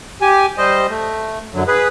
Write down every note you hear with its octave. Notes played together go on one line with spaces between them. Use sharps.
G4 G#5
G3 C5 D#5
A3
F#2 D3 F#3
G#4 B4